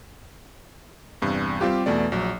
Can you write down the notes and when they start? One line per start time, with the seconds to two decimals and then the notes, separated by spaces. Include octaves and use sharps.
1.22 E2 G2 C3
1.61 G3 C4 F4 G4
1.86 E2 B2 A3 D5
2.12 A#1 F#3